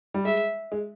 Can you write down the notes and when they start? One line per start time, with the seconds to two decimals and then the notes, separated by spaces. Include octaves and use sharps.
0.14 G3
0.25 G#3 E5
0.72 G#3